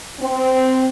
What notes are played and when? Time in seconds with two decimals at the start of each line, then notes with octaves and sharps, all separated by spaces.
0.20 C4